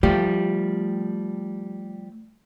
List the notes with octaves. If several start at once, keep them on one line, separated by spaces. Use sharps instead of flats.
F3 G3 A3 G4